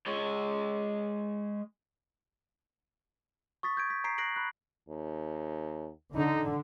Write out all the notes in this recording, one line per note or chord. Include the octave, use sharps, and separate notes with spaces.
G#3 C#5
C#6 D#6 A6 B6
G6 G#6 D7
B6
A#5 B6 C7 D7
F#6 A#6 C7 D7 F#7
B5 F#6
D#2
D3 D#4